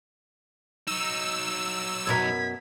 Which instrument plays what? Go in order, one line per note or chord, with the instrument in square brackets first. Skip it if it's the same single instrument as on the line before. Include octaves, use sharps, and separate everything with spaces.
[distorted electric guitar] F#3 D#4 [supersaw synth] E6
[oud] F#2 B2 A#4 [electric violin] G#6 B6